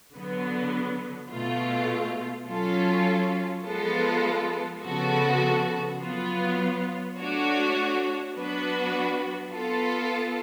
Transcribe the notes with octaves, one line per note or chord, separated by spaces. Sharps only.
D3 F#3 B3
B2 A3 F4
F#3 C#4 F4 A4
F3 G#3 B3 F4 A4
C#3 F3 B3 F#4 A4
F#3 B3 F4
A3 D4 F#4 C#5
F#3 B3 D4 F#4 B4
B3 F4 A4